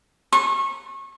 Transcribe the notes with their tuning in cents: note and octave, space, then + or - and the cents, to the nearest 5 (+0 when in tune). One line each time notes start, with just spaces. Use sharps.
C#6 -30